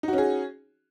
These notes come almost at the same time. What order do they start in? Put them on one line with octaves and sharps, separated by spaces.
D#4 F#4 C#4 G#4